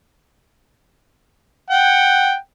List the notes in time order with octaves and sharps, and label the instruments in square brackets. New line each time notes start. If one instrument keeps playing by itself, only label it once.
[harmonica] F#5 G5